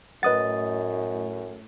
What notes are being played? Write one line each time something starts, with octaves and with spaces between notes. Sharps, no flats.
F#2 A2 B4 D#5 F#5 D#6 A6